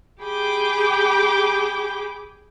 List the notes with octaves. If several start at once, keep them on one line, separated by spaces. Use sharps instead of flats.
G4 G#4 G5 B5 D6